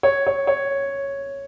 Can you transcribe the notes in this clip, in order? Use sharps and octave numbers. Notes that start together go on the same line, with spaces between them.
C#5
C#5
C#5